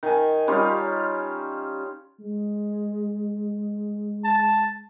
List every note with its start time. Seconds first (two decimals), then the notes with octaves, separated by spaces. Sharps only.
0.03 D#3 G#5
0.48 G3 C#4 D#4 F4
2.20 G#3
4.24 A5